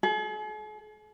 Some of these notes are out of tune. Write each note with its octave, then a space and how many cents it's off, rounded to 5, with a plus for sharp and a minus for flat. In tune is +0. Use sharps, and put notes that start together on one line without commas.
G#4 +45